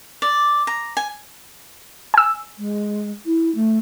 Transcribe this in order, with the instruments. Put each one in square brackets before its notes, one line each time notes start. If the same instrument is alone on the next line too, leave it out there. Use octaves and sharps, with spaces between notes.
[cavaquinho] D5
A#5
G#5
[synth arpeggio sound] G#5 E6
[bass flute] G#3
E4
A3